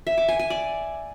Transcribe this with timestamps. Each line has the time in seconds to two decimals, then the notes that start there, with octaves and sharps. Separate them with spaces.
0.07 E5
0.18 D6
0.28 G#5
0.39 G#5
0.50 D5